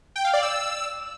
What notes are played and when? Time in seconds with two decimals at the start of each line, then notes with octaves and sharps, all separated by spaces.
0.16 G5
0.25 F5
0.33 D5
0.42 E6